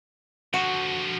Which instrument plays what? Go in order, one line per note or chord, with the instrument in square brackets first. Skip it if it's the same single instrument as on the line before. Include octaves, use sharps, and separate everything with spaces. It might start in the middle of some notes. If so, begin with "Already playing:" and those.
[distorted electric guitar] D3 F3 [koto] F#4